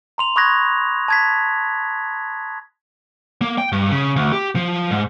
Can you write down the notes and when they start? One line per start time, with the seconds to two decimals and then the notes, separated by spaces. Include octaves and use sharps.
0.18 A#5 C6 F7
0.36 B5 C#6 D#6 F#6 G#6 A#6
1.08 A5 G#6 B6
3.42 A#3
3.58 G5
3.72 G2
3.91 C#3
4.16 D2
4.32 G4
4.56 F3
4.91 G#2